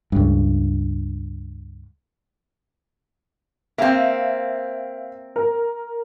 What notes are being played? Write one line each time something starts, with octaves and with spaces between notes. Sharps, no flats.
C#2 G2
A#3 C4 E5 F5
A#4